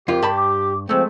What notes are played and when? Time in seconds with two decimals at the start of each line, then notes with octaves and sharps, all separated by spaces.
0.08 F2 F4 G4 A#4
0.23 G2 A5 B5
0.36 D6
0.89 F3 G#3 A3 C4 E6